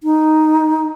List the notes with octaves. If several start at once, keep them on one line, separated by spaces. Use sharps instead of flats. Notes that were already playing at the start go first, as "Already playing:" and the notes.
D#4